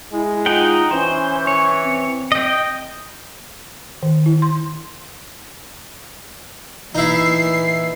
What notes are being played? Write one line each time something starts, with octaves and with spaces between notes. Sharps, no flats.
G#3 E4
D#4 F4 F#5 G5
E3 C#4 C5
C#5
C4
D#5 G5
D#3
E4
C6
A#2 E3 D#4 E4 C7